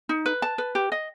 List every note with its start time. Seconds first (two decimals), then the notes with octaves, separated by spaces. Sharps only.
0.09 D#4
0.26 B4
0.42 A5
0.58 B4
0.75 G4
0.92 D#5